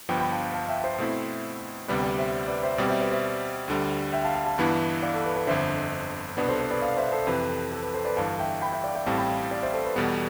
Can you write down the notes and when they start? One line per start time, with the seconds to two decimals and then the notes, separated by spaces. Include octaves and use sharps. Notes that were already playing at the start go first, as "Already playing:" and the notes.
0.09 G1 G2 F3 B3 G5 B5
0.20 G5 B5
0.31 F5 A5
0.54 F5 A5
0.69 E5 G5
0.84 C5 E5
0.98 B2 A3 C4 E4
1.88 D2 C3 G3 B3 B4 D5
2.03 B4 D5
2.18 C5 E5
2.48 B4 D5
2.63 C5 E5
2.78 B2 G3 C4 B4 D5
2.89 C5 E5
3.00 B4 D5
3.11 C5 E5
3.68 D2 D3 G3
4.13 E5 G5
4.24 F5 A5
4.35 F5 A5
4.46 F5 A5
4.58 G1 G2 E3 B3 E4
5.02 D5 F5
5.14 A4
5.25 B4
5.36 B4 D5
5.47 G1 F2 D3 C5 E5
6.37 C2 B2 B3 D4 B4 D5
6.49 A4 C5
6.59 A4 C5
6.70 B4 D5
6.82 D5 F5
6.97 C5 E5
7.12 A4 C5
7.27 F2 C3 E3 B4
7.49 A4
7.72 A4
7.83 B4
7.94 A4 C5
8.05 B4 D5
8.17 G1 G2 E3 F5 A5
8.39 E5 G5
8.61 G5 B5
8.72 E5 G5
8.84 D5 F5
8.95 E5 G5
9.06 A1 A2 G3 C4 F5 A5
9.17 G5 B5
9.28 F5 A5
9.51 D5 F5
9.62 C5 E5
9.74 A4 C5
9.85 B4
9.96 E2 B2 G3 B3 A4